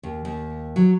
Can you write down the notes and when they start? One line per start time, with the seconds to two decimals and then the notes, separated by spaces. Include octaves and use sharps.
0.03 D#2
0.25 D#2
0.76 F#3